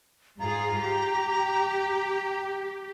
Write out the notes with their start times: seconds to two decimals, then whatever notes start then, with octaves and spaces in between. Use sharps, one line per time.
0.40 G#2 F4 G#4 A#5
0.82 G4